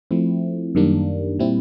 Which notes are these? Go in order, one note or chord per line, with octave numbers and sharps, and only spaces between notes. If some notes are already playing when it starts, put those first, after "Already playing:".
F3 A3 C4 E4
F#2 D#3 G3 A#3 D4
A#2 G3 C4 E4